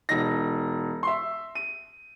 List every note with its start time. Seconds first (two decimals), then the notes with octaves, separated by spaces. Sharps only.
0.09 E1 D#4 A#6
1.03 E5 C6
1.55 D#7